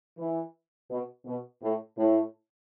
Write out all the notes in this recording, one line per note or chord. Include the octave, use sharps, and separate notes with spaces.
E3
B2
B2
A2
A2